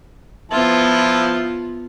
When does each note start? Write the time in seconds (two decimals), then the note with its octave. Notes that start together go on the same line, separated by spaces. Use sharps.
0.52 F3 B3 E4 F4 A5